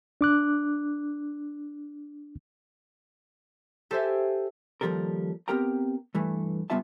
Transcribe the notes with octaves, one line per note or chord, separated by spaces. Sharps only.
D4 D6 F#6
G4 A4 C5 E5 G#5
D#2 A#2 F3 G3 A4 A#4
B3 C4 G4 A#4 G5 A#5
G2 E3 A3
C#3 G3 B3 F4 E5 A5